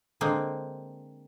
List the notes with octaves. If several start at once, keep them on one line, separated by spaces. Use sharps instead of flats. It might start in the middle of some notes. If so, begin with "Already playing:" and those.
D3 G#3 A#3 C4